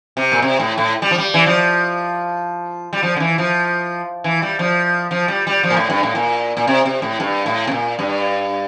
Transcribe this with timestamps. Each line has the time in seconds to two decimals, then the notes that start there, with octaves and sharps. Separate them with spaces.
0.17 C3
0.32 A#2
0.42 C3
0.60 A2
0.78 A2
1.02 G3
1.11 F3
1.18 G3
1.34 E3
1.46 F3
2.93 G3
3.03 F3
3.16 D3
3.20 E3
3.38 F3
4.24 E3
4.42 G3
4.59 F3
5.11 F3
5.28 G3
5.47 G3
5.63 F3
5.70 A#2
5.77 A2
5.90 G2
6.03 A2
6.15 A#2
6.57 A#2
6.67 C3
6.85 C3
7.02 A2
7.20 G2
7.46 A2
7.67 C3
7.71 A#2
7.99 G2